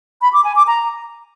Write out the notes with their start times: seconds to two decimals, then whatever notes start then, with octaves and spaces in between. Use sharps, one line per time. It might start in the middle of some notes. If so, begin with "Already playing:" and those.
0.22 B5
0.33 D6
0.44 G#5
0.56 D6
0.67 A#5